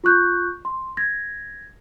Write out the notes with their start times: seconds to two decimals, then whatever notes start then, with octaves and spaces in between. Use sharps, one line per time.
0.04 F4 C#6 F#6 G6
0.65 C6
0.97 G#6 A#6